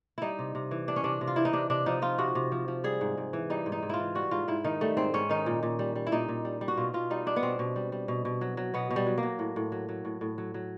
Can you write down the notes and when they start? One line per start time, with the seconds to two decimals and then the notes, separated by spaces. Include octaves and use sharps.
0.18 G3 D#4 E4
0.39 C3
0.55 C3
0.71 E3
0.87 G3 D4
0.96 C#4
1.04 C3 D4
1.21 C3
1.27 F4
1.36 E3 E4
1.45 D#4
1.53 C3 D4
1.70 C3 D4
1.86 F3 D#4
2.02 F3 F4
2.18 C3 F#4
2.35 C3
2.52 F3
2.68 F3
2.84 G3 G#4
3.01 G#2
3.17 G#2
3.33 E3
3.50 G3 D#4
3.66 G#2
3.72 D#4
3.83 G#2
3.89 E4 F4
4.00 E3
4.15 G3 F#4
4.31 G#2 F4
4.48 G#2 E4
4.64 D#3 D#4
4.81 G3 A3
4.97 G#2 C4
5.14 G#2 C#4
5.29 D#3 D#4
5.46 A#2
5.63 A#2
5.79 G3
5.96 G3
6.07 E4
6.12 A#2 D#4
6.28 A#2
6.45 G3
6.61 G3
6.68 F#4
6.77 B2 F4
6.93 B2 F4
7.10 G3 D#4
7.26 G3 D4
7.36 B3
7.43 B2 C4
7.59 B2
7.76 G3
7.92 G3
8.08 B2
8.25 B2
8.41 F#3
8.57 F#3
8.74 B2 B3
8.91 B2
8.96 G3
9.06 F#3
9.18 A#3
9.23 F#3
9.39 A2
9.56 A2
9.72 F#3
9.89 F#3
10.05 A2
10.21 A2
10.38 F#3
10.54 F#3